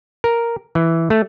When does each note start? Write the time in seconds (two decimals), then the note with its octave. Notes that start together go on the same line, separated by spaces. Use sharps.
0.24 A#4
0.75 E3
1.10 A3